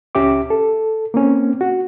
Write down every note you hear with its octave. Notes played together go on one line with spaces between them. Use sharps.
C#2 C#4 G4 E5 D6
A4
A#3 C4 C#4
F#4